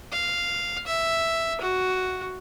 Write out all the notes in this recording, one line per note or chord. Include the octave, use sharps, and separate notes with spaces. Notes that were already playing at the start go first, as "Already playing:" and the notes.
F5
E5
F#4